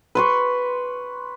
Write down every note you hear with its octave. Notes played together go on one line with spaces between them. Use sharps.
B4 C6 C#6